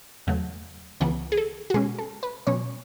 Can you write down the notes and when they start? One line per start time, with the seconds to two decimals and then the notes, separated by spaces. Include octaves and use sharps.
0.27 E2 C#3 F#3 A3
1.00 C#2 C#3 E3 B3 F#5
1.32 G#4
1.37 A4
1.70 F#4
1.74 B2 G#3 C#4 G#4
1.98 A4
2.23 B4
2.47 B2 F#3 C#4 C#5